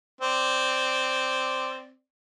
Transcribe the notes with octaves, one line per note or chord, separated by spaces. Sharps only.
C4 D5